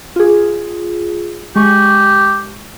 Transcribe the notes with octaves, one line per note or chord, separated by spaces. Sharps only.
F4 G#4
G#3 G4 C#6